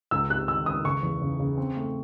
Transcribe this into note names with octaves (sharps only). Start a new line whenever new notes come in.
C#2 E6
C3 F#6
D#3 E6
C#2 D#6
C#3 C#6
E2
C#3
C#3
C4
A3